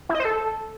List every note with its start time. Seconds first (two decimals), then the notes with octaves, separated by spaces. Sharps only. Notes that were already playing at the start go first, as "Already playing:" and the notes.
0.09 E4
0.15 D#5
0.20 C5
0.25 A4